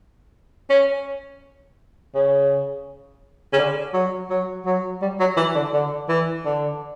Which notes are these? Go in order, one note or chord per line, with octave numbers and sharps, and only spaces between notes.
C#4
C#3
C#3
D3
F#3
F#3
F#3
G3
F#3
E3
D3
D3
E3
D3